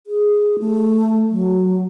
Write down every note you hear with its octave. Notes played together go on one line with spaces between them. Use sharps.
G#4
A3
F#3